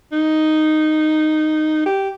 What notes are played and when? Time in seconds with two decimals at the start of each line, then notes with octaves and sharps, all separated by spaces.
0.12 D#4
1.86 G4